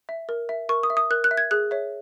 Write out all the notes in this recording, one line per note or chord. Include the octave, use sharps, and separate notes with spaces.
E5
A#4
E5
A#4 C#6
D#6
E5
D#6
A#4 F#6
F#6
E5
G#6
G#4 F#6
C#5 E5